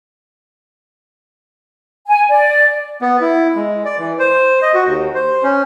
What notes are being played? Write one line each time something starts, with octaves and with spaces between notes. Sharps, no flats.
G#5
D5
B3
E4
G#3
D5
E3
C5
D#5
F#4
D#2
C5
C#4